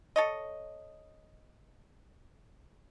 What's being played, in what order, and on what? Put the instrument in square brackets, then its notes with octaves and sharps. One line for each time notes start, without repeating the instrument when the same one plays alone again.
[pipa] A4 C#5 D#5